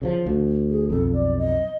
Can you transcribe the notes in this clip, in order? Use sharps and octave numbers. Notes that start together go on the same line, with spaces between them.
C#3 E3 F3
D2
G#4
B1 F2 A4
D5
D#5